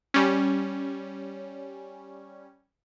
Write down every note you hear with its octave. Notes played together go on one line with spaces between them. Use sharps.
G3 C#4